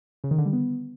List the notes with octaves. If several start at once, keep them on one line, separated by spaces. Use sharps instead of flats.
C#3
D#3
D3
G3
B3